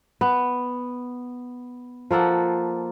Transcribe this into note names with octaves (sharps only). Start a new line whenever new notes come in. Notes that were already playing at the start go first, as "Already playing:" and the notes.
B3
F3 A#3 A4 F#5